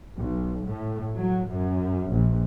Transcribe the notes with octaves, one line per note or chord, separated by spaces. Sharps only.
B1
A2
F#3
F#2
A#1